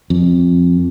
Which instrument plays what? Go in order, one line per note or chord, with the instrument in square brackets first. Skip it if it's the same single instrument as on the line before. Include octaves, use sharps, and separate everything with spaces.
[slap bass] F2